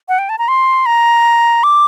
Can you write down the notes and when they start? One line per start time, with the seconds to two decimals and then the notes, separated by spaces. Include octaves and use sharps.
0.09 F#5
0.19 G5
0.29 A5
0.38 A#5
0.48 C6
0.86 A#5
1.63 D6